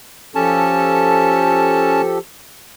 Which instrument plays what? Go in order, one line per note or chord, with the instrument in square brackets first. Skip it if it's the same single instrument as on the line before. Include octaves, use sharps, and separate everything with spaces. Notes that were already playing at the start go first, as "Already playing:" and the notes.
[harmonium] F3 G4 A4 [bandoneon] C#4 A5